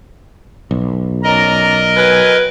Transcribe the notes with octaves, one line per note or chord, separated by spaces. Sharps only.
B1
C#4 A#4 D5 D#5 A#5
F#3 C4 B4 G#5